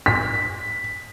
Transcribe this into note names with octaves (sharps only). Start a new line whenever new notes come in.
B6